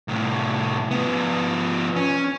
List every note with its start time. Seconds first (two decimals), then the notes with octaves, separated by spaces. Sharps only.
0.08 C2 A2
0.91 F3 B3
1.96 C#4